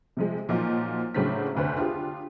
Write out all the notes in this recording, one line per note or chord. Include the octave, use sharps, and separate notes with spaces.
C3 F3 G#3
A#2 F3 F#3 A#3 D#4 F4
A2 C#3 F#3 D4 C5 B6
F1 D2 B4 C5
D4 F4 G4 G#4